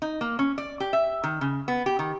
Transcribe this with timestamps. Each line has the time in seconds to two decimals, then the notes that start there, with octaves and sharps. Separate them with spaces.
0.02 D#4
0.21 A#3
0.39 C#4
0.58 D5
0.80 G4
0.93 E5
1.24 D#3
1.41 C#3
1.68 B3
1.86 G4
1.99 D#3